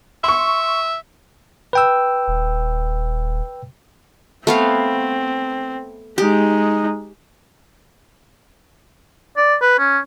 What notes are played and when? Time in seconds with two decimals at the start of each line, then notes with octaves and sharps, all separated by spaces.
0.24 E5 C6 C#6
1.73 B4 G5 E6
2.28 D#1
4.47 A3 B3 C4 F5
6.18 G#3 D#4 G4
9.37 D5
9.62 B4
9.79 C#4